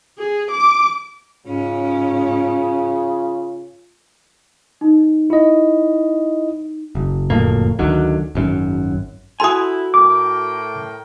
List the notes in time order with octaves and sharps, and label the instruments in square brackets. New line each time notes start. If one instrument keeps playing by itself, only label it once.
[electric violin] G#4
D6
[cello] G#2 C#4 [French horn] C#3 [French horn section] F4
[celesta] D#4
[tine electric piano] E4 D#5
[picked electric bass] F#1
F#1 F2 A2 A#3
D2 D3 D#3 F#3
G#1 F#2
[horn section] E4 [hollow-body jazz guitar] F#4 A4 G#5 [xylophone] C6 D#6
[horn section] A2 A#4 G5 [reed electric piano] D6